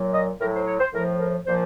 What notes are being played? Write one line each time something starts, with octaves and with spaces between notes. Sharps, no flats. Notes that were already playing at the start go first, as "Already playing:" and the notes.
Already playing: A#2 F#3
D#5
A2 F#3 A#4
C5
C#5
C5
A2 F3 A#4
A#4
A#2 F3 C5